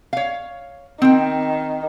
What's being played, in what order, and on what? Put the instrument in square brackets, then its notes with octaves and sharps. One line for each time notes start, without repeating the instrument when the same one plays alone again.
[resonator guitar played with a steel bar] C#5 F5
[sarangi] D#3 [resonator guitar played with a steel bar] C4 G5